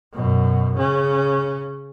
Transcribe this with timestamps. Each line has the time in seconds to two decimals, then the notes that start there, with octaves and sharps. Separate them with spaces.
0.12 F#2 B2
0.77 C#3 C#4